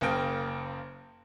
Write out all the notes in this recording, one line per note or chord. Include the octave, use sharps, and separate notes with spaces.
F#1 C#3 A#3 G5